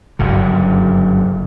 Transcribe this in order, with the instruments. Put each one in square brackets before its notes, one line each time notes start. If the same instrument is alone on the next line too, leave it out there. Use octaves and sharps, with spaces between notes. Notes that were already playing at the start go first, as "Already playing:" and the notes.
[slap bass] F#1 G2 D3